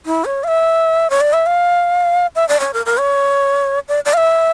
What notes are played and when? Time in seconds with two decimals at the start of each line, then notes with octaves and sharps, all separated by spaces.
0.06 E4
0.25 C#5
0.44 F5
0.48 E5
1.10 C#5
1.21 D5
1.33 E5
1.46 F5
2.35 E5
2.48 D5
2.60 C#5
2.74 A#4
2.86 A#4
2.99 C#5
3.88 D5
4.05 D5
4.13 F5
4.17 E5